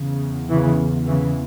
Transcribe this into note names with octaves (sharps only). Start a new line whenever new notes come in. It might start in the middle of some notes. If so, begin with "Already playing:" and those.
Already playing: E2 C#3
C#3 E3
C#3 E3